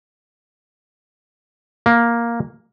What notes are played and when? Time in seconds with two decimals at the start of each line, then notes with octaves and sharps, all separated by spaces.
1.86 A#3